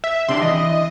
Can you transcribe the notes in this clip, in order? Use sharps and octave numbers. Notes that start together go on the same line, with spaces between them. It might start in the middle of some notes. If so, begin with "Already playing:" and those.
E5
C3 D4 D5 C6
E3 D#5